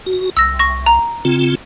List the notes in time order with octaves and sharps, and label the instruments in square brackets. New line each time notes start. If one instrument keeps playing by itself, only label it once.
[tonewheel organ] F#4
[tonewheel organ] C2 [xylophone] E6 A#6
[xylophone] C#6 A#6
A#5
[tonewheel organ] C#3 C4 F4